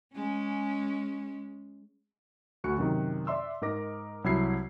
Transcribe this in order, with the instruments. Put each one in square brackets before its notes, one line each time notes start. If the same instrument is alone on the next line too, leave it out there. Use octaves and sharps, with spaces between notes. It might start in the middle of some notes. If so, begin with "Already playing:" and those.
[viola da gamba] G#3 C#4
[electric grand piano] D2 F#4 C#6 F#6 C#7
F#2 C3 D#3
D5 E5 C6 E6
G#2 D#4 A#4 D6 A#6
C2 F#3 E4 E6 G#6 C7